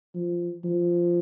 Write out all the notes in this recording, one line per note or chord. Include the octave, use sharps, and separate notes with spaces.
F3
F3